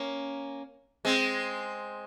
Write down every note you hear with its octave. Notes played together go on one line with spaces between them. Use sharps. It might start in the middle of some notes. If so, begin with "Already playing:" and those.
Already playing: A#3 C#4
G#3 C4